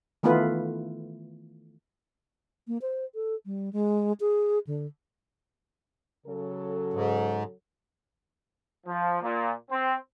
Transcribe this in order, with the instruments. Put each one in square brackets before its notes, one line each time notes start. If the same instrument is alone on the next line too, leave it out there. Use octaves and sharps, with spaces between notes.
[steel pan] D#3 E3 A3 B3 F4 B4
[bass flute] A#3
C5
A4
G3
G#3
G#4
D3
[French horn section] C#3 F#3 A4
[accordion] G#2
[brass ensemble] F3
A#2
C4